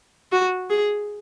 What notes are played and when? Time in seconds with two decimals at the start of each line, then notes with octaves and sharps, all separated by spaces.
0.32 F#4
0.70 G#4